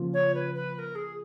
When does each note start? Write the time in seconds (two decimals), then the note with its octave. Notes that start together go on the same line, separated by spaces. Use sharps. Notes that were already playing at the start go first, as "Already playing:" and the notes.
Already playing: C#3 F3 A#3 F4
0.13 C#5
0.34 B4
0.54 B4
0.74 B4
0.78 A#4
0.95 G#4